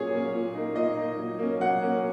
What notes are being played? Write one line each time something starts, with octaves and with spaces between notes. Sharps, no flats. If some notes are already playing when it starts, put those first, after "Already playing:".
Already playing: A#2 F#3 A#3 C#4 G#4 C#5 G#5
F#3 A#3 C#4
A#2
A#3 D#4
A#2 D#5
A#3 D#4
F#3
A#3 C#4
F#3 F#5
A#3 C#4